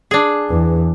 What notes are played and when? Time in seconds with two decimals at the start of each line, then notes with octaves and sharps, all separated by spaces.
0.11 D4 G#4
0.50 E2